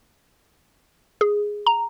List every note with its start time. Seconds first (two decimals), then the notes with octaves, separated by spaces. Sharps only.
1.21 G#4
1.66 A#5